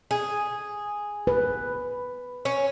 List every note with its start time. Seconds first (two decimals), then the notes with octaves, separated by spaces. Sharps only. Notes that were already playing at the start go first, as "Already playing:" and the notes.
0.11 G#4
1.27 B4
2.45 C#4